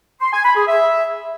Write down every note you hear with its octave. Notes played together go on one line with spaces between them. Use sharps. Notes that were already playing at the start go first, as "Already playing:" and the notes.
C6
G#5
B5
G#4
E5